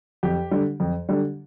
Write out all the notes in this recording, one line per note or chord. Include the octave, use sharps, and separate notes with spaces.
F2 G4
D3 G3
F2
D3 G3